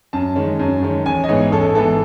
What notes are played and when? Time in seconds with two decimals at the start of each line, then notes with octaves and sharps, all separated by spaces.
0.13 F#2 A5
0.36 D#3 G#3 C#4
0.59 F#2
0.83 D#3 G#3 C#4
1.06 A1 G#5
1.24 D#5
1.28 G#2 E3 B3 C#5
1.52 A1 A4
1.75 G#2 E3 B3 A4